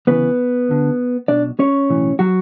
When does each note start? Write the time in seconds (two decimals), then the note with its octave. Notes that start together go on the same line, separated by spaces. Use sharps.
0.07 D2 C#3 E3 B3 B4
0.69 D2 D3
1.28 B1 B2 D4 D5
1.59 C#4 C#5
1.90 B1 A2 E3
2.19 F#3 F#4